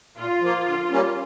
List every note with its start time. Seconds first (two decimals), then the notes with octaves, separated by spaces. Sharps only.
0.17 A#2 F4
0.41 F3 A#3
0.66 D3
0.91 G3 A#3 C#4